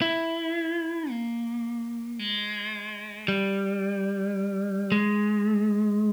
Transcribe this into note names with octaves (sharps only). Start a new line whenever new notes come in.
E4
A#3
G#3
G3
G#3